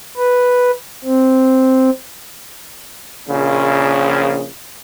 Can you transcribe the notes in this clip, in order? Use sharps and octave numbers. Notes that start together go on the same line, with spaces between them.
B4
C4
A#1 C#3